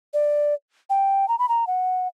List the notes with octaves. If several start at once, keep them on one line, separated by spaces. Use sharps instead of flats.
D5
G5
A#5
B5
A#5
F#5